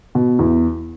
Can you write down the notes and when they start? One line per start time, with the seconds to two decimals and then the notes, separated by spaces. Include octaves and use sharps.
0.15 B2
0.39 E2